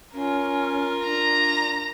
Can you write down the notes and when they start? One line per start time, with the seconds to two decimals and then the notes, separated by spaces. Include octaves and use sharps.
0.13 C#4 F4 A#4
1.04 D4 A#5